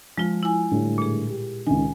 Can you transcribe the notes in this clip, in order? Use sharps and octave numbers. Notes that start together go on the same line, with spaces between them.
F3 G#3 F4
E4 G#5
A2 D3 G3
A#2 G#4
G4
C#2 D#3 G#5